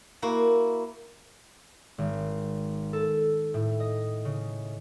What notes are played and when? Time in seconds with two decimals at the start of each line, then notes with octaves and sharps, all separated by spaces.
0.22 A#3 E4 F#4
1.98 G#1
2.93 A4
3.54 A2
3.80 D#5
4.25 C#3